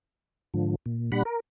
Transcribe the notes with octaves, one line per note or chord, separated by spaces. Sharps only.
G#2 D3 F3
A#2
A#2 G3 D4 F#5 B5
A#4